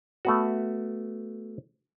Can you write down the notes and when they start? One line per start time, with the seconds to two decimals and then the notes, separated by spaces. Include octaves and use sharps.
0.25 A3 B3 F#4